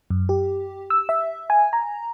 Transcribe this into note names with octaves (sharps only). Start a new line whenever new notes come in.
F#2
G4
E6
E5
G#5
A#5